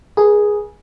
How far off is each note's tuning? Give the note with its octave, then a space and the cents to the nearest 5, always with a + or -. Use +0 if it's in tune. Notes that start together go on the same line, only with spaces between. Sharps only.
G#4 +0 B4 -45